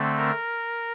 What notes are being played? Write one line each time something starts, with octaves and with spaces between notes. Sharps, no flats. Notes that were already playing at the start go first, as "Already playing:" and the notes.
Already playing: D3 A3 C4
A#4